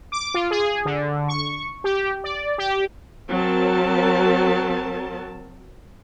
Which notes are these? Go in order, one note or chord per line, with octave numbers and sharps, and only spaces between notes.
D6
F4
G#4
D3
C#6
G4
D5
G4
F#3 C4 A#4 A5